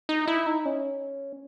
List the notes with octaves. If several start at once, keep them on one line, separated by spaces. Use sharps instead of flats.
D#4
E4
D#4
C#4